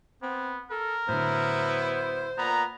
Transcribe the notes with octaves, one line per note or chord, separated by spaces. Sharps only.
B3 C4
A4 A#4
A2 D3 F#3 B3 E4 C5
A#2 B3 A#5